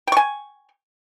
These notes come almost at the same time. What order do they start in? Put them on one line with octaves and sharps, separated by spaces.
G5 C#6 G#5